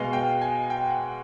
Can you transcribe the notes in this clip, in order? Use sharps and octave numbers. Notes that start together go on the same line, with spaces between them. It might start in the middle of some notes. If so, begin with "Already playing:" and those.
Already playing: B2 G#3 B3 F5
G5
G#5
G5
F#5